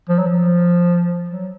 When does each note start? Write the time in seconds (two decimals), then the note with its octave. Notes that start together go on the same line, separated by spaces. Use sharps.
0.09 F3
0.19 F#3
0.26 F3
1.30 F#3